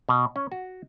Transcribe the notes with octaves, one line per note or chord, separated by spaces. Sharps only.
B2
C#4
F#4